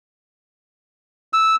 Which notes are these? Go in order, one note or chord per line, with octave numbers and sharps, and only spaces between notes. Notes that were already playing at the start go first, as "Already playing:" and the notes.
E6